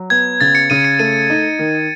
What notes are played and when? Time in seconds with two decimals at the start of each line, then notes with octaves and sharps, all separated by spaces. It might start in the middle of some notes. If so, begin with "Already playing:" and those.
Already playing: F#3
0.10 B3 G#6
0.41 C#3 A6
0.55 C#7
0.70 C#3 D#7
0.85 C#7
0.99 A3 D#7
1.30 D#4
1.59 D#3